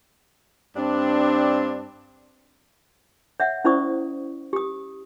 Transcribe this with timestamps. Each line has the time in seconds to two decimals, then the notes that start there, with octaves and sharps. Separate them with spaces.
0.76 G2 C4 D4
3.40 C#5 E5 F#5
3.64 C#4 E4 C5 D5 C#6 D#6
4.53 G4 D#6